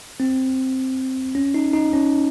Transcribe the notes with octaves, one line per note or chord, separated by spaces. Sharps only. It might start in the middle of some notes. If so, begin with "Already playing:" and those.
C4
C#4
D#4
D#4
C#4